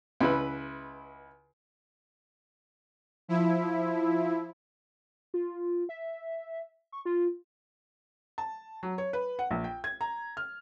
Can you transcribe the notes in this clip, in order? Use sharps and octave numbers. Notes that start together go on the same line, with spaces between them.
C#2 E4 B4
F3 E4
F4
E5
C#6
F4
A5
F#3
C#5
B4
F#5
A#1
G5
G#6
A#5
F6